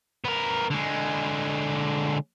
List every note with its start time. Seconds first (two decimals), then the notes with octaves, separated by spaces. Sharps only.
0.25 B3 A#4
0.71 D3 G#3